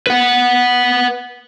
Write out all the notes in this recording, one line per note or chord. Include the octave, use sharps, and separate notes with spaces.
B4 F#5